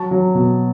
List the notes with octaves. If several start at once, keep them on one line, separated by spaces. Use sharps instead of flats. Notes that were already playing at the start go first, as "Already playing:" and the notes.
Already playing: F#3 A5 C#6
F#3
B2